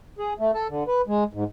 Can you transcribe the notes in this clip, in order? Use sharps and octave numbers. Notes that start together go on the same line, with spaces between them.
G#4
A3
A4
D3
B4
G#3
G#2